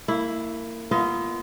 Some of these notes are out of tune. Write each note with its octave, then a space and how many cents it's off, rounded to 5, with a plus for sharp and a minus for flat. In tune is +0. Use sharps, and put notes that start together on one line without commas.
A#3 -30 E4 +0
B3 -25 F4 -25 D#5 +25